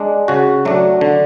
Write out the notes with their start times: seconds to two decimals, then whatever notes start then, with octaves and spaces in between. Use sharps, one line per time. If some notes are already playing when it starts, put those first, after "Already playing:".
Already playing: G#3 D4
0.28 C#3 F#4
0.65 F#3 A3 D4
1.01 D3